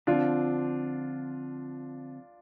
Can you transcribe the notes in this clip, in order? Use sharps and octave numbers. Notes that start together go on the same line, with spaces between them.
D3 F3 C4 D4 F4